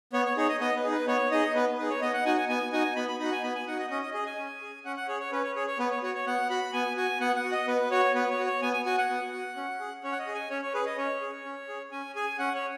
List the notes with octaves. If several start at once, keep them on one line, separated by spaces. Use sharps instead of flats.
B3 C#5
C#5
D#4 G#4 C#5
D#5
B3 D#5
B4
D#4 G#4
B4
B3 C#5
D#4 G#4 D#5
B3 B4
D#4 G#4 B4
C#5
B3 D#5
F#5
D#4 F#4 G#5
G#5
B3 G#5
D#4 F#4 G#5
B3 B5
B5
D#4 F#4 B5
G#5
B3 B5
G#5
D#4 F#4 F#5
D#5
C#4 D#5
D#5
G#4 D#5
G#5
C#4
G#4
C#4 F#5
F#5
G#4 C#5
C#5
C#4 B4
C#5
G#4 C#5
C#5
B3 B4
C#5
F#4 C#5
C#5
B3 F#5
F#4 B5
B3 G#5
F#4 G#5
B3 F#5
F#5
F#4
D#5
B3 B4
F#4 C#5
B3 B4
C#5
F#4
C#5
B3 G#5
G#5
F#4 G#5
F#5
B3
F#4
C#4
G#4
C#4 C#5
F#5
D#5
G#4
G#5
C#4 C#5
C#5
G#4 B4
D#5
C#4 C#5
G#4
C#4
G#4
C#4 G#5
G#4 G#5
C#4 F#5
C#5